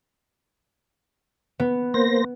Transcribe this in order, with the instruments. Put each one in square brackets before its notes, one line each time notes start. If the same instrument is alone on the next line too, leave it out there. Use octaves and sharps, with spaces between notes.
[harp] B3
[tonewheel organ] A#3 C5 A#6